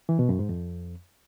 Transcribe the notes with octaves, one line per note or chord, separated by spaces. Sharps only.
E3
B2
F#2
G#2
F2